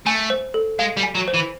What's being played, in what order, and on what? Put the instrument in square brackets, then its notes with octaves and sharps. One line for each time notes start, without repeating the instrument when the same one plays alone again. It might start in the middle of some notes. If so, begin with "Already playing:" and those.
[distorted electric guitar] A3 [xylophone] G#5
[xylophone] C5
A4
[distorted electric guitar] G#3 [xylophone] F5
[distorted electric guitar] G3
[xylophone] G#5
[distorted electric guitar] F#3
[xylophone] C5
[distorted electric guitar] E3